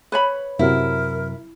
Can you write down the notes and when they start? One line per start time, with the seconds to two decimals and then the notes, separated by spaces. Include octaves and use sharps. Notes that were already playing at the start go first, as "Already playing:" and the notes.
0.12 B4 C#5 B5
0.59 F#2 C3 F#3 E4 A#4